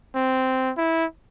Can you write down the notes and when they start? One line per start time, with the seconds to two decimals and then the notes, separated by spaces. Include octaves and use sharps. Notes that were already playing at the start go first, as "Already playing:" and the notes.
0.15 C4
0.78 E4